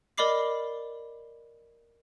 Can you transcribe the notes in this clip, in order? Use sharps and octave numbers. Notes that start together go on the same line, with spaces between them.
A#4 D5 D#5 B5 D6 C7